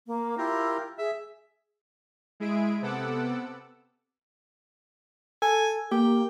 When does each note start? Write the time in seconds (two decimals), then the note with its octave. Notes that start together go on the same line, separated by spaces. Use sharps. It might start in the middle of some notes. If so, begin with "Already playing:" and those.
0.07 A#3
0.38 E4 F4 G4 A#4
0.98 G#4 E5
2.40 G#3 E4 G#4 E5 D7
2.82 C3 B3 A4 F#5 D6 E6
5.42 A4 G#5
5.92 A#3 G4 G5